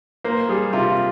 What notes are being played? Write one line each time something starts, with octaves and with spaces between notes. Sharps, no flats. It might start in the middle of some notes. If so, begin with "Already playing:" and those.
A#3 C5
G3 G#4
C3 F4